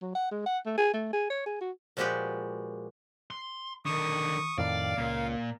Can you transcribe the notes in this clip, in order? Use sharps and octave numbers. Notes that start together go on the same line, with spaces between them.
F#3
F#5
G#3
F#5
A3
G#4
A3
G#4
C#5
G#4
F#4
A#2 F3 G#3 F#4 G4 B4
C6
D3 D#3 C#6 D#6
F2 A2 D#3 D5 F5
C#2 A#2